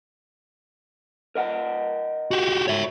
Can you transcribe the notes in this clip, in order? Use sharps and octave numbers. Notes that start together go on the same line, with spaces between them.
A#4 D#5 F#5
F#4 G4
C#5 E5